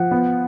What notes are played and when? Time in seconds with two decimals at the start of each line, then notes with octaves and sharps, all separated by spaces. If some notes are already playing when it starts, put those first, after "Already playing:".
Already playing: F3 F#5
0.11 B3